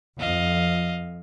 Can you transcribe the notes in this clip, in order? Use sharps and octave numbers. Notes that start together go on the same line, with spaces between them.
F2 D#5 F5